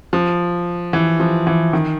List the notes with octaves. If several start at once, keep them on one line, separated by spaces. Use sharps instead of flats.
F3
E3
F3
E3
D#3